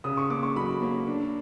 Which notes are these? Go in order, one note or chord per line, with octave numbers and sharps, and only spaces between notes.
C#3 D#6
C#6
A#3 D6
C#6
F#3 B5
A#3
D4